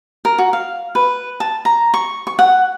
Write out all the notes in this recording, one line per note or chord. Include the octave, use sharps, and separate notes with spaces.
A#4
F#4
F5
B4
A5
A#5
C#6
C#6
F#5